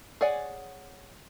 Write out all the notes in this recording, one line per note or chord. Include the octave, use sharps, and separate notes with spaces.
G#4 C#5 D5 F#5 G#5